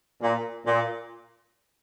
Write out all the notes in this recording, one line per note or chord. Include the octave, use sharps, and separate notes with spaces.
A#2
A#2